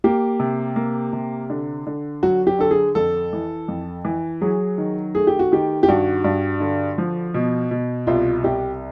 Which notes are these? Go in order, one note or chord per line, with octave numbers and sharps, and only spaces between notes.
A#3 G4
C3
A#3
C3
D3
D3
F#3 F#4
G4
D3 A4
G#4
F2 A4
E3
F2
E3
F#3 G#4
D#3
A3 G#4
G4
F#4
D#3 G4
G4
G2 F#4
G2
D3
F3
B2
B2
C2 F4
C2 G4